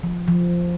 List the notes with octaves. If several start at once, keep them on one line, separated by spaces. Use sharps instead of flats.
F3
F3